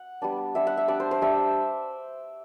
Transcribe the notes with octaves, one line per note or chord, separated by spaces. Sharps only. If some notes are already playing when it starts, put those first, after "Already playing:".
Already playing: F#5
G3 B3 D4
G3 D4 E5
F#5
E5
G3 D4 D5
C5
C5
G3 D4 E5